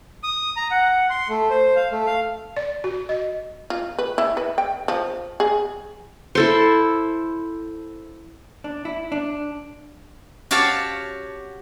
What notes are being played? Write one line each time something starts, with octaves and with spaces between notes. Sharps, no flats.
D#6
A#5
F#5
C6
A3
C5
F5
A3
F5
D5
F#4
D#5
F4
B4
E4
B4
G5
F3
G#4
E4 A4 C5
D4
E4
D4
F#4 G4 C#5 F5 A5